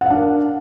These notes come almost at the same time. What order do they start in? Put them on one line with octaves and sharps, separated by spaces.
F#5 F5 D4 A#4